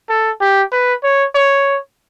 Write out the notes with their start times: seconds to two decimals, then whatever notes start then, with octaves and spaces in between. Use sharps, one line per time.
0.09 A4
0.41 G4
0.72 B4
1.04 C#5
1.35 C#5